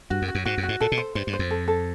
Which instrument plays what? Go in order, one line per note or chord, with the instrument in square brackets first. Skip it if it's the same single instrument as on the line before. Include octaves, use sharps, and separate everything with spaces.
[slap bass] G2 [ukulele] F#4
[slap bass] F#2
[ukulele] F#4
[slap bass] F#2
[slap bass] G#2 [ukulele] F#4
[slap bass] F#2
[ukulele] F#4
[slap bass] G#2
[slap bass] A#2 [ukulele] A4
[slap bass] B2
[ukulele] C5
[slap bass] G2 [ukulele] C5
[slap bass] G2
[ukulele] C5
[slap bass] F2
[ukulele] A4
A4